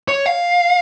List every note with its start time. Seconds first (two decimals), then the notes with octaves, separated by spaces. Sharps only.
0.08 C#5
0.26 F5